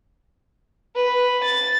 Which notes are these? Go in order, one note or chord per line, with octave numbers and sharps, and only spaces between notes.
B4
A6